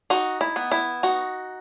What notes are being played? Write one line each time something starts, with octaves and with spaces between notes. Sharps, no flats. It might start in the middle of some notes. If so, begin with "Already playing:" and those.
D#4 F#4
E4
B3
E4
D#4 F#4